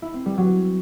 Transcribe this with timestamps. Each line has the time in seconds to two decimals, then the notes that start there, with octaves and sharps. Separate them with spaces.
0.02 E4
0.14 C4
0.26 G3
0.38 F#3